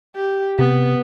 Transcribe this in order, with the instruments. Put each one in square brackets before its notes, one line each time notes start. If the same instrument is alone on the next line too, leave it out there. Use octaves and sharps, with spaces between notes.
[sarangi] G4
[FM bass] C3 [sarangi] B3